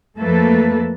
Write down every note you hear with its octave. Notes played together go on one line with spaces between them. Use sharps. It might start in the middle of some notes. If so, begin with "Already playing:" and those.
F2 F3 A3 A#3 A4 B4